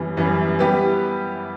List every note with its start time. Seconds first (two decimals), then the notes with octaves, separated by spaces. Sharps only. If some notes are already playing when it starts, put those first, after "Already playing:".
Already playing: F#2 E3 G3 B3
0.17 F#2 E3 G3 B3
0.59 G3 B3 E4 G4 B4